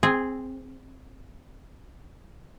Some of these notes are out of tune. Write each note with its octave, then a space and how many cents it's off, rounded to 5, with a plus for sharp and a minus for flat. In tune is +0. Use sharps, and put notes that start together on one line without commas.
C4 +0 G#4 +0 G#5 -35